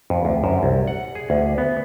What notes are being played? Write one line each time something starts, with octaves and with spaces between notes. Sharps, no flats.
F2
D2
F#2
C2
F#5
G#4
D2
B3